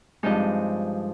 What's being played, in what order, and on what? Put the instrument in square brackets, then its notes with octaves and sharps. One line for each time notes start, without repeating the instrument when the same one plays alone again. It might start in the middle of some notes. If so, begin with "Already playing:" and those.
[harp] G2 F3 G#3 C4 D#4 D#5